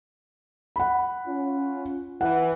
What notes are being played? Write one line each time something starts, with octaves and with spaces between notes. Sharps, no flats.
F#5 B5
C#4 F4
E3 F#5